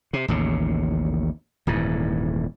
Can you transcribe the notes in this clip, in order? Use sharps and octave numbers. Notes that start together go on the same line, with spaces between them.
C3
A1 D#2 C#3
D#1 G#2 E3